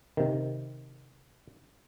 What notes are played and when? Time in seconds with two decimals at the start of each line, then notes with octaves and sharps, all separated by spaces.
0.17 C3 D#3